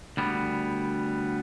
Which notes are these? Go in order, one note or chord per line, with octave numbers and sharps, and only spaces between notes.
D2 G3 B3